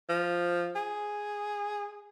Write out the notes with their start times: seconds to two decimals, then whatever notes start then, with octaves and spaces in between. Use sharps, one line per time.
0.09 F3
0.76 G#4